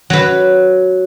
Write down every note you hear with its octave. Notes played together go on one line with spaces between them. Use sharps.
F#3 B4